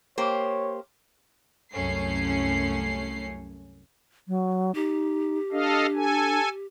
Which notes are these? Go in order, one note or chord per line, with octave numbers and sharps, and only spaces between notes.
A#3 G4 C5 C#5
C2 F#2 A3 C#4 C7
F#3
D#4 G4
D4 A4 D#5 F5
A4 G#5